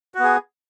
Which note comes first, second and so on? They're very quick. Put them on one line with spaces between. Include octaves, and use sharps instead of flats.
F#4 B3 G#4